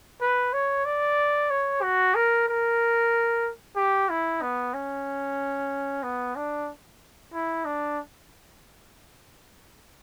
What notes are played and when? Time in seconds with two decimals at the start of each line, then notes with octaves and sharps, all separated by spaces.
0.21 B4
0.53 C#5
0.85 D5
1.50 C#5
1.82 F#4
2.15 A#4
2.48 A#4
3.76 G4
4.10 E4
4.42 B3
4.74 C#4
6.03 B3
6.36 D4
7.33 E4
7.65 D4